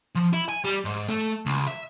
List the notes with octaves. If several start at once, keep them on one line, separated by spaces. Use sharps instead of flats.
F3
E4
G#5
G3
G#2
A3
C#2
E5